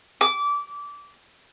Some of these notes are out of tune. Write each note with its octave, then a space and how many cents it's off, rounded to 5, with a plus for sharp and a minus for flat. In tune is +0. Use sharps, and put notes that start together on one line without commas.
D6 -20